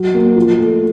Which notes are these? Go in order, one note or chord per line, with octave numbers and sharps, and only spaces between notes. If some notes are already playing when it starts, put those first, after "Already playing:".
Already playing: F#3
A#3
F3
A3